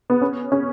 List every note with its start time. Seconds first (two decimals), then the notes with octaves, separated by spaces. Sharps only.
0.10 B3
0.22 C#4
0.52 C#4